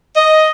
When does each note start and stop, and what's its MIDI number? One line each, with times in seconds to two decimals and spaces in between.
0.17 0.51 75